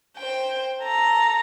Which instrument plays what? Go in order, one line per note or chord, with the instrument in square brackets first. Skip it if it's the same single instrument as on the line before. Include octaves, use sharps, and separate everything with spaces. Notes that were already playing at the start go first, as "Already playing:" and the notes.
[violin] C5 G5
A4 A#5